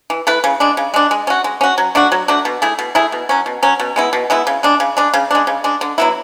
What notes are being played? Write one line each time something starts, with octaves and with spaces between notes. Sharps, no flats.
E3
A3 E4 B4
C#3
G#3 D4
C#3
G#3 D4
G#3
C#4 F#4
G#3
C#4 F#4
F#3
A3 D4 F#4
F#3
A3 D4 F#4
B2
A3 E4 G#4
B2
A3 E4 G#4
B2
F#3 C#4
B2
F#3 C#4
B2
G#3 B3 E4
B2
G#3 B3 E4
C#3
G#3 D4
C#3
G#3 D4
C#3
G#3 D4
C#3
G#3 D4
D3
F#3 B3 E4